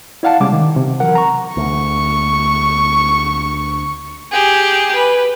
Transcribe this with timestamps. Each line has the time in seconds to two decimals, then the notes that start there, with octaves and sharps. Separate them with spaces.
0.23 E4 D5 F5 F#5 A5
0.40 C3 G3 G#3 C#4 D6
0.53 D#3
0.76 C3
1.00 E3 F#3 A#4 F#5
1.15 A#5 C#6
1.57 D2 C#6
4.31 G4 G#4
4.95 B4